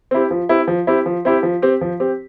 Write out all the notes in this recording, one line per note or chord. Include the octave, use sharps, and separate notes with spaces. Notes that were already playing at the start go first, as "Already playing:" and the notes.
C4 E4 G4
F3
C4 E4 G4
F3
C4 E4 G4
F3
C4 E4 G4
F3
C4 G4
F3
C4 G4